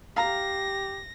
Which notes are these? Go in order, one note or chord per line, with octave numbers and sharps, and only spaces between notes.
G4 F5 A#5 A#6